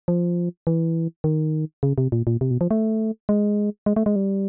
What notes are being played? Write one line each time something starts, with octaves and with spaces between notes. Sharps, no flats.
F3
E3
D#3
C#3
C3
A#2
A#2
C3
B2
F3
A3
G#3
G#3
A3
G#3
G3